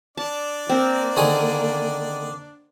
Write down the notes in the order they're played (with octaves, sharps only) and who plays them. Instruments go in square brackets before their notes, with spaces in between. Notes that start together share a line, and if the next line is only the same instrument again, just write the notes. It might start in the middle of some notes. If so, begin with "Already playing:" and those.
[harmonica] D4 D5 [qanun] A5
[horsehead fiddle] A#3 [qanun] C4 A#4
[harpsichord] D3 D#3 G#4